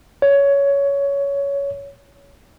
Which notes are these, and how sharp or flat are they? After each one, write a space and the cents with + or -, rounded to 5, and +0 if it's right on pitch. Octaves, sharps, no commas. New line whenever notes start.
C#5 +15